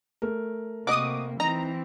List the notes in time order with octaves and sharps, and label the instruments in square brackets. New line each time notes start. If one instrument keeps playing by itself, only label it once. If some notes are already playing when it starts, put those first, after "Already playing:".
[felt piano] A3 A#4
[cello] C3 A#3 [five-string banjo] F#4 D#5 [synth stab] D6 D#6
[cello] E3 C4 [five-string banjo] D#4 [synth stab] A#5